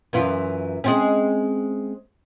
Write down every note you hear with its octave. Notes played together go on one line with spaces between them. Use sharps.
F#2 E3 F4
G#3 C4 C#4